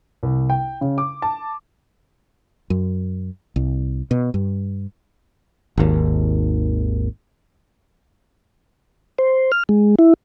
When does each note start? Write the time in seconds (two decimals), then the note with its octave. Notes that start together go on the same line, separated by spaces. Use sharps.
0.23 C2
0.50 G5
0.81 C#3
0.98 D6
1.22 A5
2.70 F#2
3.56 C2
4.11 B2
4.34 G2
5.78 G#1 D#2
9.18 C5
9.52 F6
9.69 G#3
9.99 E4